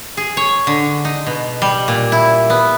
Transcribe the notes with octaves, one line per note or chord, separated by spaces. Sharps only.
G#4
C#5
D3
D#4
B2
G3
A#2
E4
B3